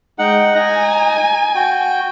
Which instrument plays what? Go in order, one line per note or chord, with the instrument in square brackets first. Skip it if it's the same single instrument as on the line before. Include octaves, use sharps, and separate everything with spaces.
[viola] G#3 G5 [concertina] D#4 F#5
[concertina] D#4 A#5 [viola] G#5
[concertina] F#4 G5